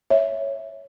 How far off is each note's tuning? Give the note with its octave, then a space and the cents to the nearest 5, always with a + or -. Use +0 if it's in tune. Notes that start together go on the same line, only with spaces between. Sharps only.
C#5 +0 E5 +0